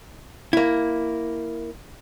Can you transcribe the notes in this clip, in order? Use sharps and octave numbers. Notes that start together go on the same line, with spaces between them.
A#3 E4